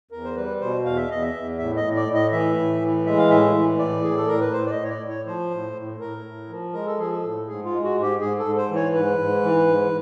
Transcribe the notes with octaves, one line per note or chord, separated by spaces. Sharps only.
E2 A#4
C5
G3 B4
B2 C5
E2 F5
E5
E2 D#5
E5
E2
A2 E5
D#5
A2
D5
A2
D#5
E3 E5
A2
E3
G#3 E5
F5
A2 E5
E3
A2 D5
A2 G#4
A4
A2 A#4
B4
A2 C5
D5
D#5
A2
C#5
D5
A2
C#5
F3 C5
A2
A2
A2 A#4
A2
F3
G#3 A#4
A4
F3 G#4
A4
A2
G#2 G#4
F4
G#3
F#4
G#2
G4
G#2 G#4
A4
G#2
C5
E3
C#5
G#2 B4
G#2
E3
G#2